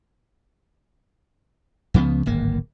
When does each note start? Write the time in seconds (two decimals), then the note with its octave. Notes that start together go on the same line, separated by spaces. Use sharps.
1.94 C#2 C#3 F3 B3
2.26 D1 G#1 A#3